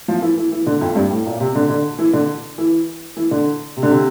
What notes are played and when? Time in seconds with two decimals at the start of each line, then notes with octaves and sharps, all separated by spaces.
0.08 F3
0.22 E3
0.37 E3
0.52 E3
0.66 D3
0.81 F2
0.95 G2
1.10 A2
1.26 A#2
1.40 C3
1.55 D3
1.69 D3
1.99 E3
2.13 D3
2.58 E3
3.17 E3
3.31 D3
3.76 C3
3.83 D3
3.91 C3